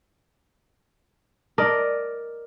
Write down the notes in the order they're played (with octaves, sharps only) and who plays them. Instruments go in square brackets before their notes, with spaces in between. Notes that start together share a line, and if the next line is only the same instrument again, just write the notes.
[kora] A#4 D5 D#5